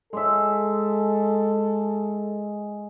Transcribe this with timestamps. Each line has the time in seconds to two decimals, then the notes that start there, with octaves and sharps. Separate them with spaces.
0.13 G#3 A4 E5